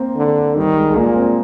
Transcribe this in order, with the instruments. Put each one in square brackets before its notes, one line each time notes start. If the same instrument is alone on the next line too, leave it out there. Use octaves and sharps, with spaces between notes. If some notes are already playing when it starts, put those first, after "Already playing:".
Already playing: [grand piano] A#3 C4
[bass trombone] D3
[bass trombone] D#3 [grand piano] G3
[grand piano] G#3
G#3
[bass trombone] A#2 [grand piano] A#3
[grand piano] C4